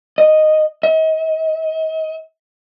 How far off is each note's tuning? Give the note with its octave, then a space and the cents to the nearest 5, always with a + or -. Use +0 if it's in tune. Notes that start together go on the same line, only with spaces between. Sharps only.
D#5 -5
D#5 +40